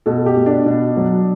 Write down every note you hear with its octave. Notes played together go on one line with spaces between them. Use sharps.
B2 A4
G4
B2
D4
B2
F#3